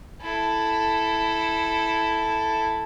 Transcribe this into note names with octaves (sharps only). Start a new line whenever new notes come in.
E4 A4